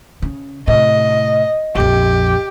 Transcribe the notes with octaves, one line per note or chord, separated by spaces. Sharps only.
C#3
A2 C3 D#5
A#1 F2 G4